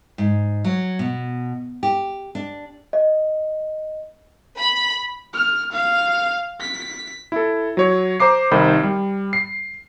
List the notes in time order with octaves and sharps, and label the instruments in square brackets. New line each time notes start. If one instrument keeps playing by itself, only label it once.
[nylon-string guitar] G#2
F#3
B2
G4
D4
[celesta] D#5
[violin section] B5
[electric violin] F6
F5
B6
[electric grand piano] E4 A4
F#3 C#5
C5 A#5 D6 C7
C2 D#3 D#4 C5 B5
G3
C7